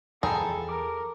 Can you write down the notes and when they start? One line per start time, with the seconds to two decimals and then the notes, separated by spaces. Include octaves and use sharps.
0.23 E2 F3 G#4 A4 G5 A#5 B5
0.69 A#4 D6